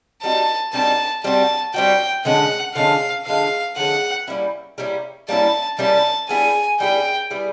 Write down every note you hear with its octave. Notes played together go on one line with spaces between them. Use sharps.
G3 C4 D#4 F#4 A5
G3 C4 D#4 F#4 A5
G3 C4 D#4 F#4 A5
G3 C4 D#4 F#4 G5
D3 F3 G#3 C#4 F#5
D3 F3 G#3 C#4 F5
D3 F3 G#3 C#4 F5
D3 F3 G#3 C#4 F#5
G3 A#3 C#4 E4
G3 A#3 C#4 E4
G3 A#3 C#4 E4 A5
G3 A#3 C#4 E4 A5
G3 B3 E4 G#4 G#5
G3 B3 E4 G#4 G5
G3 B3 E4 G#4